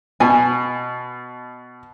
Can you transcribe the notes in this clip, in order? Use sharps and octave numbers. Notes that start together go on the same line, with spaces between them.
B2 G#5